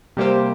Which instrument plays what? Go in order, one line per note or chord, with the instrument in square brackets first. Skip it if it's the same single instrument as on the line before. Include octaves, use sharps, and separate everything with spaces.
[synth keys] C3 G3 A#3 G4 C5